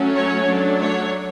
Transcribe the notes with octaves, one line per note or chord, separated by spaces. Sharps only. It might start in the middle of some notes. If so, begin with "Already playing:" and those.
Already playing: F#3 A3 C#4
C#5
F#3 A3 D4
C#5